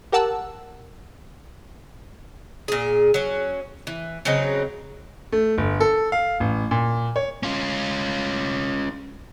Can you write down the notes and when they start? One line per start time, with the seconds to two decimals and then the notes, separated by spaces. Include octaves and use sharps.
0.12 G4 A#4 F#5 A5 E6 F#6
2.68 A#2 G#4
3.14 F#3 C#4
3.87 E3
4.25 C#3 F#3 C4 D#4
5.32 A3
5.58 G1
5.80 A4
6.12 F5
6.40 A1
6.71 A#2
7.16 C#5
7.43 C#4 F4